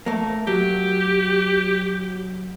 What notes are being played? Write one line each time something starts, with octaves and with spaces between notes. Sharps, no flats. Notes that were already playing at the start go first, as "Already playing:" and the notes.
A3 A#3
F#3 G4